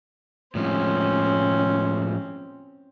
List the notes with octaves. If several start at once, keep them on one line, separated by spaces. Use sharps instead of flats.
A2 F3 G#3 C4 C#4